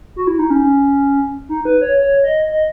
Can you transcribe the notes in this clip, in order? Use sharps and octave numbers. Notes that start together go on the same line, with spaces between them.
F#4
E4
D#4
C#4
D#4
B4
C#5
C#5
D#5
D#5